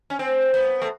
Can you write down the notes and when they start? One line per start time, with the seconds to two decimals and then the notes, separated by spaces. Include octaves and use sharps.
0.10 C#4
0.19 C4
0.54 B3
0.82 A3